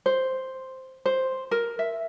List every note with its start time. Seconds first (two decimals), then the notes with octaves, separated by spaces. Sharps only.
0.06 C5
1.05 C5
1.51 A#4
1.79 E5